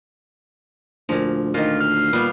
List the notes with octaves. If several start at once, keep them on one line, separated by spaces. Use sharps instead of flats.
D2 A#2 F3
A#2 D#3 F4
F5
A#2 G3 B3